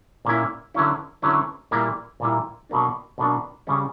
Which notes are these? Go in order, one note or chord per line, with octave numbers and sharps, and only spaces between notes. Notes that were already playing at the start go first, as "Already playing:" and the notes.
A#2 A#3 C#4 E4
D3 F#3 C#4 E4
D3 F#3 C#4 E4
A#2 G3 A#3 E4
A#2 G3 A#3 E4
B2 F#3 A#3 D4
B2 F#3 A#3 D4
C#3 G3 C#4